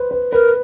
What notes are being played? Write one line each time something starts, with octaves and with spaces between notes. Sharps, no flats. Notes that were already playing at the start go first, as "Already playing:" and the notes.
Already playing: B4 C5
B4
A#4 B4